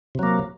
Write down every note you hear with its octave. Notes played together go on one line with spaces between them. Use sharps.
C3 F#3 A#3